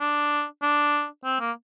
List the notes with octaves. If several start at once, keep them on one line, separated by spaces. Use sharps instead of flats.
D4
D4
C4
A#3